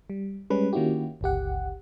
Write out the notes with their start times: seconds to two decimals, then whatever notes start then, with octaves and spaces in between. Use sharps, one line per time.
0.10 G3
0.50 G3 G#3 C#4 B4
0.73 D#3 A#3 C#4 E4 F#4 G4
1.21 G1 C#2 G4 F#5